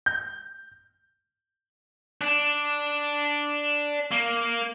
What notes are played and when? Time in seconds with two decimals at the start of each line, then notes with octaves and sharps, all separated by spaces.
0.06 G6
2.21 D4
4.11 A#3